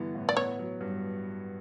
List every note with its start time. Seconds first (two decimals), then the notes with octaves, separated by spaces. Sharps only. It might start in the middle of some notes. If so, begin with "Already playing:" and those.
Already playing: G2 D3 E3 B3
0.15 A2
0.29 D5
0.37 B3 C#5
0.59 F#3
0.81 G2